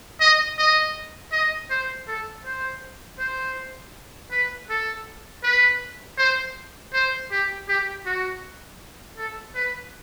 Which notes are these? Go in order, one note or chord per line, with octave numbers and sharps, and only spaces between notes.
D#5
D#5
D#5
C5
A4
C5
C5
B4
A4
B4
C5
C5
G4
G4
F#4
A4
B4